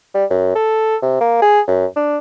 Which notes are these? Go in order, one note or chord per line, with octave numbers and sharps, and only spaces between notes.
G3
F#2
A4
C3
A#3
G#4
F#2
D4